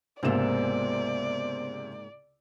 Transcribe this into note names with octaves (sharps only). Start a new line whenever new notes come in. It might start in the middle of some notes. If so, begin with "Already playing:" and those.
C#2 G#2 C3 A#3 B3 C5 D5 E7